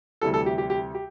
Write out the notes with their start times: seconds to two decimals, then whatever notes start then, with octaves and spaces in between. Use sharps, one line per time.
0.21 D2 C3 E3 G3 A4
0.34 A4
0.46 G4
0.58 G4
0.70 G4
0.95 G4